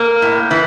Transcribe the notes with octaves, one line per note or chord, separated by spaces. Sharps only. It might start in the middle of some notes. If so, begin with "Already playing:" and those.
Already playing: A#3
A2
E3